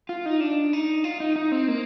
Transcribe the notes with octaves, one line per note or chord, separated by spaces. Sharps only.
F4
D#4
D4
D#4
F4
D#4
D#4
C4
A#3